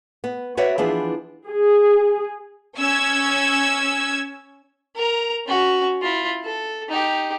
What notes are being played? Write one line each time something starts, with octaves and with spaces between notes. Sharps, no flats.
B3
F#4 B4 C#5 D5 E5 F#5
E3 F3 B3 D4 G#4
G#4
C#4 E6 G#6
A#4 A#5
C#4 F#4
E4 F4
A4
D#4 G4